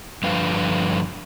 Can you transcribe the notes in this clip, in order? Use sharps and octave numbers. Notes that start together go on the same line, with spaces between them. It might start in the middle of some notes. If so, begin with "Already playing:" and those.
G2 D3 F3 D4 B4 F5